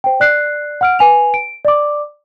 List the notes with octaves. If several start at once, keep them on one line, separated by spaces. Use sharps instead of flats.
C5 G5
D5 F#6 C7
F#5 F6 D7
B4 G#5 F7
D7
D5 D6